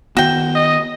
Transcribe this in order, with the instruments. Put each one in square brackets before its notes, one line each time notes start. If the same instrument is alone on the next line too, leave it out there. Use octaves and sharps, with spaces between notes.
[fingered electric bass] D#3 B3 [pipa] F#4 G5
[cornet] D#5